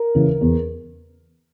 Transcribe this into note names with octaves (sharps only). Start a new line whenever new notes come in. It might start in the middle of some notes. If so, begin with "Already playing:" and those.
Already playing: A#4
C#3 E3
E2